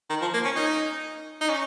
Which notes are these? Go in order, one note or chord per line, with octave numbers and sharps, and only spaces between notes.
D#3
F3
A#3
C#4
D#4
D#4
C#4